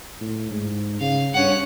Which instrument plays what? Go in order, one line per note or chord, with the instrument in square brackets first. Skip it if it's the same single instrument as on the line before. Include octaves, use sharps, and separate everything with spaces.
[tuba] A2
G#2
[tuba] C#3 [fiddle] F5
[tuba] G2 [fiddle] C#4 F#5